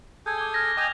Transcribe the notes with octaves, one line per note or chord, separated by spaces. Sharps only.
G#4 A4 G#5 G6 G#6
D6 G6 G7
F6 G#6 A#6
D#5 G5 G#5 D6 G6 F7